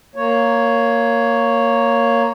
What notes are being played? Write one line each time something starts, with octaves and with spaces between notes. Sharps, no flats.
A#3 C#5